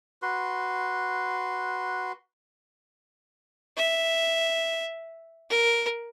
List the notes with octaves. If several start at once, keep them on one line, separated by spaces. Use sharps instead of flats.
F#4 B4 C6
E5
A#4